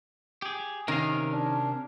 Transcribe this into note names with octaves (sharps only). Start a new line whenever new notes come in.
G4 G#4
C3 D#3 C#4 A#4 F5
D4